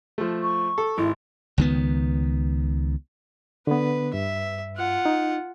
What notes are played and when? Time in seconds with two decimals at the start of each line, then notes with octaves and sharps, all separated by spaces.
0.18 F3 A3
0.43 C#6
0.78 A4
0.98 G#1 E4
1.58 C#2 D#3 B3
3.67 D3 B3 B4
4.14 G2 E5
4.76 F4 F#5
5.06 D#4